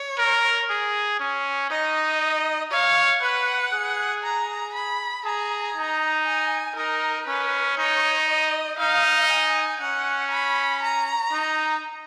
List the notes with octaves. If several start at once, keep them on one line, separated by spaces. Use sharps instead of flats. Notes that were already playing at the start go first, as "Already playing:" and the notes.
Already playing: C#5
A#4
G#4
C#4
D#4 D#5
C#5 F5
B4 F#5
G#4
A#5
B5
G#4 A#5
D#4
G#5
D#4 A#4
C#4 B4
D#4 C#5
D#5
D#4 F5
G#5
C#4 F#5
B5
A#5
D#4